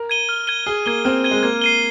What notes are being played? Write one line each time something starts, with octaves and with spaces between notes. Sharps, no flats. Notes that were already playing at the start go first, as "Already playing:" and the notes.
Already playing: A#4
G#6 D#7 G7
F6
G#6 D#7 G7
G#4 F6
A#3 G#6 D#7 G7
C4 F6
G#6 D#7 G7
G#3
A#3 G#6
C7 D#7 G7